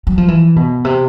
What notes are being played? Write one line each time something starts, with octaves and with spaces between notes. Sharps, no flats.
F#3
F3
E3
B2
C3